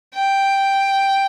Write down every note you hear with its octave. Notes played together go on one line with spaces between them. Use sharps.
G5